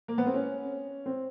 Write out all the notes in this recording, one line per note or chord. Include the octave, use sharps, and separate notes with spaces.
A#3
B3
C4
C#4
C4